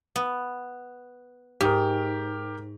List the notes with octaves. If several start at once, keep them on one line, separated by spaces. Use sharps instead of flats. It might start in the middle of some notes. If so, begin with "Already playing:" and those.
B3
G#2 G4 A#4